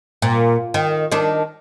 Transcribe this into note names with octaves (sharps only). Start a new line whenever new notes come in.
A#2
D#3
D#3 D4